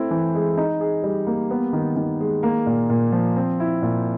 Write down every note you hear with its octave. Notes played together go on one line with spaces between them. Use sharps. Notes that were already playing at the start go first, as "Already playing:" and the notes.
Already playing: A3 C4 E4
E3
G#3
D#4
G#4
G3
A#3
B3
D#3
D#3
G#3
A#3
A#2
A#2
F3
C4
E4
A#2